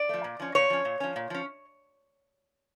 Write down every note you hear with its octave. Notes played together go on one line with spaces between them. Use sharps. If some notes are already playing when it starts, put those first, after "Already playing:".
Already playing: D5
F3 A3
A#2
F3 C#4
A#2 C#5
F3 C#4
A#2
F3 C#4
A#2
F3 C#4